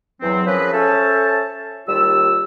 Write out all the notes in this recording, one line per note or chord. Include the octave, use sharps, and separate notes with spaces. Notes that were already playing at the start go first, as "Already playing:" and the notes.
E2 F#3 C4
F3 C#4 G#4 A#4 B4
C#4 A4 C5 E5 A5
D#2 G3 F4 E6